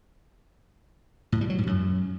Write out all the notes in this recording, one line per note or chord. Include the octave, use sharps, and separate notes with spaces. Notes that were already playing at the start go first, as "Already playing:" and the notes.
A2
G3
F#3
G#2
F#2